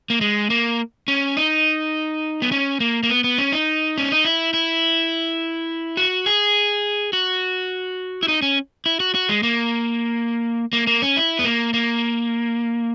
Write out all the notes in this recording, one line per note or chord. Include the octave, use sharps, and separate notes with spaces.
A#3
G#3
A#3
C#4
D#4
B3
C#4
A#3
A#3
B3
B3
C#4
D#4
C#4
D#4
E4
E4
F#4
G#4
F#4
E4
D#4
C#4
E4
F#4
F#4
G#3
A#3
A#3
A#3
C#4
E4
B3
A#3
A#3